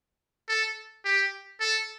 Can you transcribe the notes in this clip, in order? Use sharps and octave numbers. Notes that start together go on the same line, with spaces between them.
A4
G4
A4